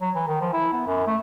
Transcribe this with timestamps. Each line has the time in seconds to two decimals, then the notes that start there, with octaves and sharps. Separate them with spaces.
0.01 F#3
0.16 E3
0.28 D#3
0.41 F3
0.53 E4
0.73 B3
0.87 F#2
1.07 A3